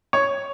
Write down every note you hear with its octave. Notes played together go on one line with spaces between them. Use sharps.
C#5